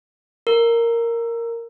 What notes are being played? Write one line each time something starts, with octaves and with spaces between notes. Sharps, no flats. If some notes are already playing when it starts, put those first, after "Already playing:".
A#4